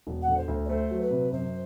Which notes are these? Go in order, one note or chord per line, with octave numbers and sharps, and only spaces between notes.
E1
F#5
D3
C5
D2
D5
A3 C5
F#3
B4
C3
F#2 C5